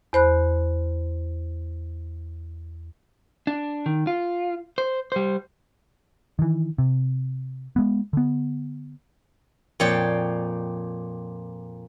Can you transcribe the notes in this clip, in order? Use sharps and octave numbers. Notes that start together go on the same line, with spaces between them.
E2 C5 B5 F#6
D4
D#3
F4
C5
G3 C5
D#3 E3
C3
G#3 B3
D3 B3
F2 A#2 C#5 D5 G5